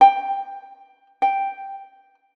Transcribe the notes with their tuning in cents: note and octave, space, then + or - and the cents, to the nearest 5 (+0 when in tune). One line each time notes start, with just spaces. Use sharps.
G5 +10
G5 +0